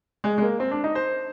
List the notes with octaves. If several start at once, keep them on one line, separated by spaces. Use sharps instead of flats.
G#3
G#3
A#3
C4
D4
D#4
C5